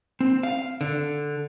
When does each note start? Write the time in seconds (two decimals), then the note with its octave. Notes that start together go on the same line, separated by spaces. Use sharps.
0.20 C4
0.43 F5
0.81 D3